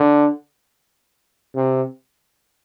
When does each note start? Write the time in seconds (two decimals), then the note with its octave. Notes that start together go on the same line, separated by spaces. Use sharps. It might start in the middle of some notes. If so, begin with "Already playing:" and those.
Already playing: D3
1.55 C3